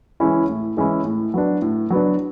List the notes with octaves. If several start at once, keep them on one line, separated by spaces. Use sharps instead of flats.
E3 G#3 C#4 E4
A2
E3 G#3 C#4 E4
A2
F#3 B3 D4
A2
F#3 B3 D4